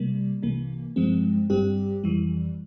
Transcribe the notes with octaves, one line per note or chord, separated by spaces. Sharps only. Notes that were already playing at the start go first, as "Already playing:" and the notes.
Already playing: C3 G3 A#3
C2 C3 E3 A#3
G2 F3 G#3 C4
G1 G2 G3 C4 G4
F2 E3 G3